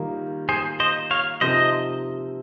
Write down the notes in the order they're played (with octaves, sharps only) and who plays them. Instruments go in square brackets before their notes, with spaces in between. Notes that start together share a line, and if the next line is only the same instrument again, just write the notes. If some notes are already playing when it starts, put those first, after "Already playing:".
Already playing: [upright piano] D#3 G3 A#3 F4
[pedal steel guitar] G#4 C5
C5 D#5
C#5 F5
[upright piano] C3 F3 C4 D#4 A#4 [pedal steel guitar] C5 D#5